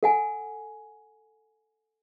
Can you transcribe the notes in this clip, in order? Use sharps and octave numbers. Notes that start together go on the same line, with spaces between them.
A4 F#5 G#5